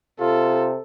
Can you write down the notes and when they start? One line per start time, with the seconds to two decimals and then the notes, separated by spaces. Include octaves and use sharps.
0.20 C3 F4 A4